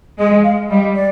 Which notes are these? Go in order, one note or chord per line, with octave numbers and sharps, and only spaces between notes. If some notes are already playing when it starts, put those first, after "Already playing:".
G#3 D#5
F5
G3 D#5
D5